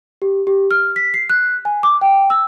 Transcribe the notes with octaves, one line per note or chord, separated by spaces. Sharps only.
G4
G4
F6
B6
C7
F#6
G#5
D6
G5
E6